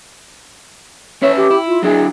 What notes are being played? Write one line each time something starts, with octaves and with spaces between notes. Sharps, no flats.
C#4 B4 C#5 E5
G4
E4
F4
F#3 D4 E4 G#4